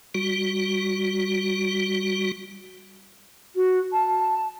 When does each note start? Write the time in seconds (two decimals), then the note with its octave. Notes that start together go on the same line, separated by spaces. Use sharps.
0.15 G3 F#4
3.55 F#4
3.92 A5